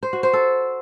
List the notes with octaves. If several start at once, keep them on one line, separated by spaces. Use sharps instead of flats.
C5
F#4
C5
A4